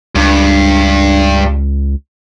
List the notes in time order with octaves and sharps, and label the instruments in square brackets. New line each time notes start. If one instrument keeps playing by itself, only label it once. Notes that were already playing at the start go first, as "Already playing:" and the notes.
[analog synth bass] C#2 [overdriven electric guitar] G2